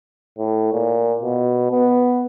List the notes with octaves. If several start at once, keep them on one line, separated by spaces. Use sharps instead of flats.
A2
A#2
B2
B3